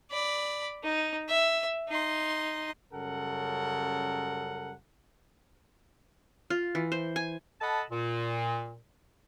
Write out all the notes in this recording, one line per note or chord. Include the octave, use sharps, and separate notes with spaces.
D5 B5
D#4
E5
D#4 C6
F#2 C#3 G3 A4 A#4 F#5
F4
E3
C5
G#5
A4 D#5 F#5 A5 B5
A#2